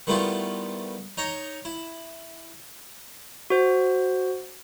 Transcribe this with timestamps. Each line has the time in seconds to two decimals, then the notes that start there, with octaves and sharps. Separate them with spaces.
0.07 D#3 G3 A3 B3 E4 F4
1.17 D#4 C#5 A#5
1.65 E4
3.50 F#4 C5